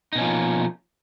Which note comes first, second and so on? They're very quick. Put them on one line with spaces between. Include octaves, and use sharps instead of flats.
D#4 B2 C#4 F3 A#3